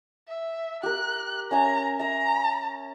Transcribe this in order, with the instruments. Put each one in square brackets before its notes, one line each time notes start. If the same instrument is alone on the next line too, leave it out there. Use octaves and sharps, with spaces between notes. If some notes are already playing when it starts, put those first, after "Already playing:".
[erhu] E5
[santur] G4 A#4 [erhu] F#6
[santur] C#4 E5 G#5 [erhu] A#5
[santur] E5 E6 [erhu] A#5